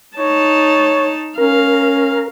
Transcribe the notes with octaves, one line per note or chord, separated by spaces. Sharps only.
D#4 C#5 A5
C#4 A#4 F5